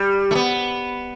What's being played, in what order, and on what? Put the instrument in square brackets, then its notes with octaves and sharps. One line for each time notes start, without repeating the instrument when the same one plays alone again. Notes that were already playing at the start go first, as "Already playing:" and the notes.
Already playing: [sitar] G3
A3
B3